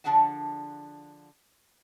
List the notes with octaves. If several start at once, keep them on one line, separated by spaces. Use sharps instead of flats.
D3 F3 D4 G#4 F#5 A5